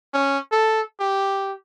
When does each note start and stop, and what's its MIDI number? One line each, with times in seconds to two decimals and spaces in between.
0.14 0.38 61
0.52 0.81 69
1.00 1.53 67